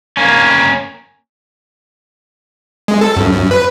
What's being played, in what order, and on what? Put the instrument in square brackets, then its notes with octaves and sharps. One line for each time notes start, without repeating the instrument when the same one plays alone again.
[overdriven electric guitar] A#3 C#4
[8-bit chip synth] G#3
A4
F#2
F#2
B4